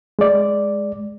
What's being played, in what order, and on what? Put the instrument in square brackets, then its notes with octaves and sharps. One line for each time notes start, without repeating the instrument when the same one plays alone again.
[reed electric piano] G#3 D5